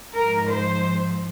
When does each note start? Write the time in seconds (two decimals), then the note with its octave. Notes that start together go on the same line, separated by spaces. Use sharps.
0.14 G#2 F3 A#4
0.49 C5